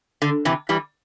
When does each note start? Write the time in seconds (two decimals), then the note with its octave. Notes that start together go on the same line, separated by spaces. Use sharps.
0.22 D3
0.45 C3 E3
0.69 E3 G3